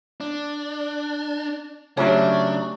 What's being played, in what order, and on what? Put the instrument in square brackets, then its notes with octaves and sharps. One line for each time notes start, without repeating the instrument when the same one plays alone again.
[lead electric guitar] D4
[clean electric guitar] C#3 F#3 [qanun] A3 C4 G4 [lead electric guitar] D4 [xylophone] C#5